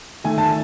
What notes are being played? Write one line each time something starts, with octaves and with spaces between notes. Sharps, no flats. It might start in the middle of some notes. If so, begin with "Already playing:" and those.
D#3 A3 G#5
A5